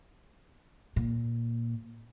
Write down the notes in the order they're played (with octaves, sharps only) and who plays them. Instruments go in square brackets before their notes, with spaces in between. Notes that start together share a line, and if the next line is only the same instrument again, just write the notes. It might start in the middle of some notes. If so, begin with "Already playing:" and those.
[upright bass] A#2